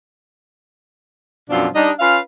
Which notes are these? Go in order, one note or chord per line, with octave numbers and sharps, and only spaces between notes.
F#2 B2 F3 C4 D4 F4
G3 D4 D#4
C#4 F4 B4 F5